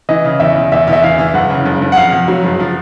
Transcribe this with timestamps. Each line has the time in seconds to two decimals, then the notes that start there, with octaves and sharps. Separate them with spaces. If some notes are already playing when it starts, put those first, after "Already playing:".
0.09 E3 D#5
0.24 C#3
0.40 E2 E5
0.56 E2
0.72 E2 E5
0.87 E2
0.93 E5
1.02 E3 F5
1.18 E3
1.34 F#1 F#5
1.50 C#3
1.65 F#1
1.82 F#1
1.92 F#5
1.97 F2 F5
2.12 F2
2.28 F#3
2.44 F#1
2.59 F3